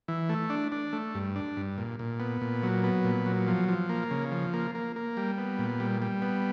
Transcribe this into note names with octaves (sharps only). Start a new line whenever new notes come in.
E3
A3
D4
D4
A3
G2
D4
G2
A#2
A#2
B3
A#2
F#3
B3
A#2
F#3
F3
F3
A#3
C#3
F3
A#3
A#3
A#3
G3
B3
A#2
G3
G3
B3